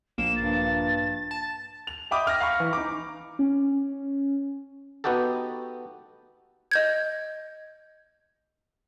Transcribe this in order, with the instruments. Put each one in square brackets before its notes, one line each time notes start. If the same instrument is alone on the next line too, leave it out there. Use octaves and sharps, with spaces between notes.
[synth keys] A#1 A#3 [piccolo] E7
[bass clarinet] G2 [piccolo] A6
[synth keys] A5
[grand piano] F7
D#5 E5 G5 B5 D6 D#6
F6 A#6
F5 B5 C#6
E3
D#4 D6
[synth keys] C#4
[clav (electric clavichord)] B3 D#4 F#4 G4 A4
[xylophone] D#5 G6 G#6